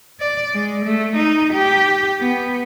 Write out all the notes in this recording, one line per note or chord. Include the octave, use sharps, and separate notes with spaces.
D5
G#3
A3
D#4
G4
B3